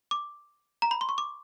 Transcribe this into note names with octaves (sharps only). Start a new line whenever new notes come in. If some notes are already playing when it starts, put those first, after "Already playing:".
D6
A#5
B5
C6
C#6
D6